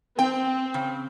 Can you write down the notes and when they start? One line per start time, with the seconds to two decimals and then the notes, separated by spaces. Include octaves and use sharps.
0.19 C4 G5
0.74 C#3